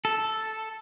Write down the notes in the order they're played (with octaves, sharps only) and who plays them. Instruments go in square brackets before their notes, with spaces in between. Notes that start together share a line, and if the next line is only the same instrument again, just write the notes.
[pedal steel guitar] A4